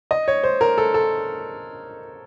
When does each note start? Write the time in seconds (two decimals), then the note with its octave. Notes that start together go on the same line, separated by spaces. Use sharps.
0.11 D#5
0.28 C#5
0.44 C5
0.61 A#4
0.78 A4
0.94 A4